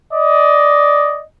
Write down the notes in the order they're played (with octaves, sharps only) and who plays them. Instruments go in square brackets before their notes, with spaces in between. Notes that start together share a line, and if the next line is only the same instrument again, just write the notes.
[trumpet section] D5 D#5